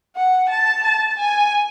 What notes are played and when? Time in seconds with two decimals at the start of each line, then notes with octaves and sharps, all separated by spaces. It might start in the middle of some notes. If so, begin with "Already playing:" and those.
0.16 F#5
0.50 A5
0.84 A5
1.19 G#5